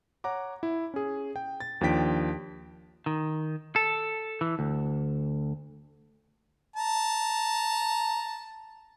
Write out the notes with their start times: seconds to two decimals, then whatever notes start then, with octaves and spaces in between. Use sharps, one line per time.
0.24 C#5 F#5 A#5 D6
0.63 E4
0.94 C#4 G#4
1.36 G5
1.60 A6
1.81 D#2 F3 D4 G5 B6 D7
3.06 D#3
3.76 A4
4.41 E3
4.59 D2
6.76 A5 A#5